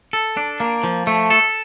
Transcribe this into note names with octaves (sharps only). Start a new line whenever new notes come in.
A4
D4
A#3
F3
A3
A4